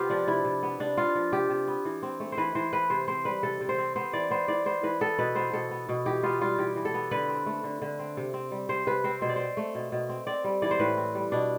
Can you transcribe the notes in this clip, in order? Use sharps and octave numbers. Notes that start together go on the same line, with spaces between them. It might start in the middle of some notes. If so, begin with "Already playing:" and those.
Already playing: C3 B3 F4 G4
F3 D4
C3 E4
C3
B3
C3 D4
B3 F4
F3
C3 G4
C3
B3
E3
C4
A3
C5
E3 B4
E3 C5
C4 B4
C3 C5
C4 C5
G3 B4
C3 A4
C3
C5
C4
B3 C5
E3 D5
B3 C5
E3 D5
B3 C5
E3 B4
B3 A4
B2 B4
B3 C5
B2 A4
B3
B2
E3 G4
B3 F4
G3 F4
E3 G4
E3
A4
B3
D3 B4
C4
A3
D3
D3
C4
C3
C4
G3
C3 C5
C3 B4
C4 C5
B2 C5
D5
C4 C5
A3
B2
B2
C4
C4 D5
G3
E3 D5
C5
A2 B4
C4
G3
B2 D4